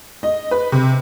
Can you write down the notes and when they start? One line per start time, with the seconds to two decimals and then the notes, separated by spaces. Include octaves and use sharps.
0.23 D#5
0.51 B4
0.72 C3